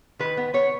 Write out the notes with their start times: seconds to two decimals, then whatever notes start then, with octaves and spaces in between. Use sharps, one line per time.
0.19 D#3 B4
0.37 B3
0.54 B3 C#5